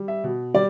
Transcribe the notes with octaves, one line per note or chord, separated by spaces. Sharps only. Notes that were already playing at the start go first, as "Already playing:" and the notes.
Already playing: G3
E5
B2
G3 D5